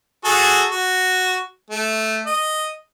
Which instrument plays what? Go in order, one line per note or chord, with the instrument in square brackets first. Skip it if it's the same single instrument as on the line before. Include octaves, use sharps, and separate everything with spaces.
[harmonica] F#4 G#4 A4
F#4
A3
D#5